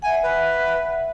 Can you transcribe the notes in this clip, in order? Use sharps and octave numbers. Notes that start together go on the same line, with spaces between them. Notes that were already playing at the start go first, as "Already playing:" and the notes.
E5 F#5 G#5
B4